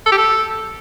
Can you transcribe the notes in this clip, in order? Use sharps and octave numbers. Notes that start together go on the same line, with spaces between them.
A4
G4
A4